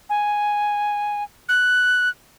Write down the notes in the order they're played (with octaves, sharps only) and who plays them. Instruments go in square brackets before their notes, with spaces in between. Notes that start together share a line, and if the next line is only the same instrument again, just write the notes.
[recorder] G#5
F#6